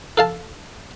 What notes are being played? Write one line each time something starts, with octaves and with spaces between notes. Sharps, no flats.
A4 F5 A5